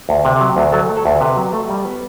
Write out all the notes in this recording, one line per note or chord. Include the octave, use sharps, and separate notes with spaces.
D2
C3
F#3
D2
F#3 A4
A3
A4
D2
C3 B4
F#3
A3
G3
B3